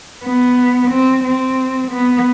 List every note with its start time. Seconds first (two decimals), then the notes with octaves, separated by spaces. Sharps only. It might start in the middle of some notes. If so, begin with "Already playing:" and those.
0.24 B3
0.91 C4
1.24 C4
1.91 B3